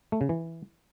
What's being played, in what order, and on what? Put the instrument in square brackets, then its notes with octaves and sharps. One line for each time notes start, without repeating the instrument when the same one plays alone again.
[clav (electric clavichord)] A3
C#3
E3